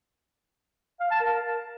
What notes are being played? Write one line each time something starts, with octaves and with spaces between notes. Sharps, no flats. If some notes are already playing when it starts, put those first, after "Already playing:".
F5
A5
A#4